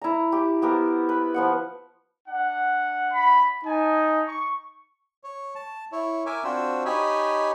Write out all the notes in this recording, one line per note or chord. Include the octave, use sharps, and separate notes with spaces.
E4 A#5
G4
B3 G4 A#4 C5
B4
F3 B3 F#5
D4 F#5
B5
D#4 G#5 A5
C#6
C#5
A5
E4 C#5
A#4 E5 G#5 D6
C4 D4 F4 F#4 C5 E6
D#4 G4 C#5 D#5 G#5 B5